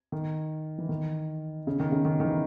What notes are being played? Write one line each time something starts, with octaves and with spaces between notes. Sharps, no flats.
D#3
E3
D#3
C#3
D#3
C#3
D#3
D#3
E3